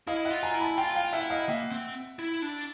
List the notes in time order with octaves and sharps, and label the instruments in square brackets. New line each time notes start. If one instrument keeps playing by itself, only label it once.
[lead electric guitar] E4 [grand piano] D#5 F5
[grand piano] E5 F#5
[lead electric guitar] F4
[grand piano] G#5 A#5
[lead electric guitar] E4
[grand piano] A5 B5
[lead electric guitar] F4 [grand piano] G5 A5
[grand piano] F5 G5
[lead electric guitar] E4 [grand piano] E5 F#5
[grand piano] D#5 F5
[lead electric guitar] A#3 [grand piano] E5 F#5
[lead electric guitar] C4
E4
D4